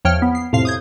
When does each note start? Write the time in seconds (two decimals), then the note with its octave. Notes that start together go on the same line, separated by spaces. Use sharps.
0.05 E2 F3 C#5 G5 F6
0.22 B3
0.35 C7
0.53 F2 A2 C3 F5 C7
0.65 D#6 G6 G#6